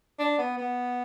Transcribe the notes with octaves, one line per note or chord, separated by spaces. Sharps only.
D4
B3
B3